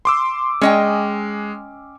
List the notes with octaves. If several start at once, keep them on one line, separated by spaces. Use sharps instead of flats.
C6 D6 E6
G#3 C#4 D#5 G5